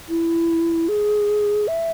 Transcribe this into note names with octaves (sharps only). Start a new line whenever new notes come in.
E4
G#4
E5